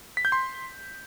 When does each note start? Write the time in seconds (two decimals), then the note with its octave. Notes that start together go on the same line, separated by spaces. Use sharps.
0.17 B6
0.25 G6
0.32 C6